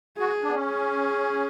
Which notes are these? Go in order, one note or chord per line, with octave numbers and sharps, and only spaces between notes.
F#4 G#4
D4
B3
C#4
G#4